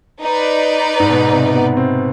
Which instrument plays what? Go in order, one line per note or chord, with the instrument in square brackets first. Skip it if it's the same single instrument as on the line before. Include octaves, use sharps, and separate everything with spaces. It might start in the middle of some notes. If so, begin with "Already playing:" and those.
[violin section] D#4 B4 D5
[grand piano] G#2
B2
C3
B3
C4